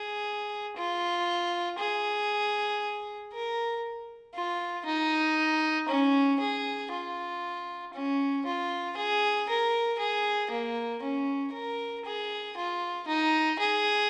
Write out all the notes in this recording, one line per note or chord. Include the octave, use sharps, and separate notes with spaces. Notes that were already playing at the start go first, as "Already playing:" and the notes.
Already playing: G#4
F4
G#4
A#4
F4
D#4
C#4
G#4
F4
C#4
F4
G#4
A#4
G#4
A#3
C#4
A#4
G#4
F4
D#4
G#4